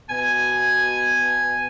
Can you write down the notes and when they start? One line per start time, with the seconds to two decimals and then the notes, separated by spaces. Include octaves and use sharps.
0.10 B2 G#5